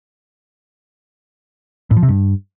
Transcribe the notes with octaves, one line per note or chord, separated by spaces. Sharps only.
A2
F3
C3
G2